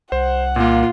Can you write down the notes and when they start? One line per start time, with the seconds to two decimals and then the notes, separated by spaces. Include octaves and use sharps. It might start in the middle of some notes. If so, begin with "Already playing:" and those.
0.12 C2 C5 F#5
0.56 A#2 A#3 F4